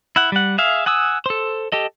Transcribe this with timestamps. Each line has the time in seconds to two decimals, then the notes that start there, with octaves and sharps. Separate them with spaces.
0.16 E4 F#5
0.32 G3 F#5
0.58 G#4 E5 F5
0.86 F#5 G#5 D#6 E6
1.26 A4 C5
1.72 G4 A4 D#5